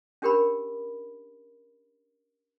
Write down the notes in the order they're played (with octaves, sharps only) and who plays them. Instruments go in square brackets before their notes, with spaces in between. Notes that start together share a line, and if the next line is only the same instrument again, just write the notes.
[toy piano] C#4 D4 G4 A#4 C5 B5